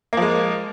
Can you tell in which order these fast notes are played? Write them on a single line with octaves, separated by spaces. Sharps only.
A#3 F3 G#3